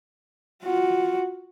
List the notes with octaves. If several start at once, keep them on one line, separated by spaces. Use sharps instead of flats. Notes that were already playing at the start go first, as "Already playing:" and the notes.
F4 F#4